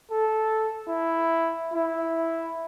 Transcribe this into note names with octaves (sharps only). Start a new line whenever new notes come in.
A4
E4
E4